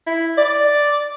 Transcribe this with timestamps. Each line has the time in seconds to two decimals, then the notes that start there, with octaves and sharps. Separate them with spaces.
0.07 E4
0.38 D5